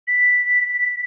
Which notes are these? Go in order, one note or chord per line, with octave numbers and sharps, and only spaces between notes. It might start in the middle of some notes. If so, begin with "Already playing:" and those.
B6